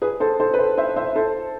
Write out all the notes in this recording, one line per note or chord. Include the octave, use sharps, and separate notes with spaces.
G#4 B4
A4 C5
A4 C5
B4
A4 C5
C5 E5
C5 E5
A4 C5